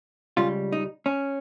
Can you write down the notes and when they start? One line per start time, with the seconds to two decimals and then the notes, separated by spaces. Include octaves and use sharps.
0.37 C#2 C#3 G3 F4
0.72 D#4
1.06 C#4